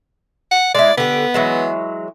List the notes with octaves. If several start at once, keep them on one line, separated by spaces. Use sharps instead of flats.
F#5
G#3 E4 D5
D3 B3 G4
E3 F#3 G#3